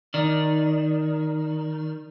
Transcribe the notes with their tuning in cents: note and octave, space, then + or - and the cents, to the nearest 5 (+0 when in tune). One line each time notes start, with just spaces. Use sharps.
D#3 +0 D5 +0